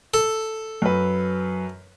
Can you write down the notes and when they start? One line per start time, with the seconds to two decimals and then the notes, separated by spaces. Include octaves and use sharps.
0.14 A4
0.82 F#2 B4